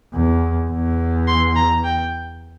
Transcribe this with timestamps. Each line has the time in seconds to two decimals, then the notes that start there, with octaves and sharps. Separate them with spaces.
0.14 E2
0.71 E2
1.27 C6
1.56 A#5
1.84 G5